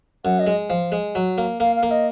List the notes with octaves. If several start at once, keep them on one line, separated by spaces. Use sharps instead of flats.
F#2 F#5
D#5
G#3
F3
G#3
F#3
A#3
A#3 F5
F5
A#3
D#5